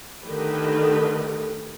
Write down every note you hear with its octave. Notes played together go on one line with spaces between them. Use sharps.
D3 D#3 A3 D#4 G4 B4